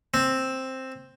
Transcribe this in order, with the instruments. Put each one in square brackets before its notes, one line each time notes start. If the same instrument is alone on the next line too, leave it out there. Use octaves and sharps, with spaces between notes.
[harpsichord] C4